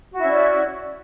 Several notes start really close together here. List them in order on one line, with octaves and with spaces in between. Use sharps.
F#4 E4 C#4 D5